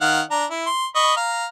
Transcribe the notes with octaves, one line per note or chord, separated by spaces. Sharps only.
D#3 F5 F#5
D4 A#5
E4
C6
D#5 B5 C#6
F5 A#5